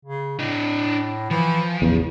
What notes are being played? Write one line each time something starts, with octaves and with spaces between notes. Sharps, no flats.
C#3
A2 D4 D#5
E3 F3
A1 E2 C#3